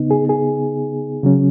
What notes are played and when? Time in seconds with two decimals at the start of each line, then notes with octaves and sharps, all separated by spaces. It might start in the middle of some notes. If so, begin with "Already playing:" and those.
Already playing: C#3 B3 D#4
0.11 G#4
0.29 G#4
1.24 C#3 F#3 C#4